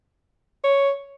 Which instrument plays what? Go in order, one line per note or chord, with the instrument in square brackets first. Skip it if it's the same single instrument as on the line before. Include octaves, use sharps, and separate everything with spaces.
[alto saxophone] C#5